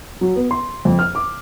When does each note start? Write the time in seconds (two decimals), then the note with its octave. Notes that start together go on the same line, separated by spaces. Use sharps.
0.21 F#3
0.36 B3
0.51 C6
0.85 F2
0.99 F6
1.15 D6